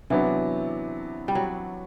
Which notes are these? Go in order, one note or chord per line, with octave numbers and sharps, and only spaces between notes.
C3 E3 F#3 B3 D4
G3
F#3